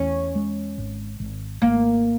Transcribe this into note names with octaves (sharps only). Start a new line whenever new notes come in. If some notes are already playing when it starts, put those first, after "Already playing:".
Already playing: E2 C#4
G#3
G#1
G#1
G#1 A#3